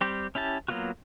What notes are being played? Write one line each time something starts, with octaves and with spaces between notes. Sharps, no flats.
G3 C4 G4
C#4 E4 G4 A5
F#3 A#3 B3 F4 F#4